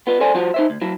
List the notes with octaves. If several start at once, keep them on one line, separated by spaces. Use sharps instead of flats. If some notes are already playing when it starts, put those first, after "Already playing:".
B3 F4 B4
G#4 A4 C5 D5 G#5
F3 F4 F#4 C5
D#4 C5 E5
D2
F#3 E4